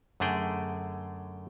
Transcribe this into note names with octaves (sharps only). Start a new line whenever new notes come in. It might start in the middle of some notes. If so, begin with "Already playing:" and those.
F#2 D3 A3 G#4 G5